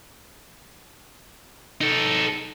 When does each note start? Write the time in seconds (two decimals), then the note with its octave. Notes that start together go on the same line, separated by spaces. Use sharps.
1.81 D#4 A4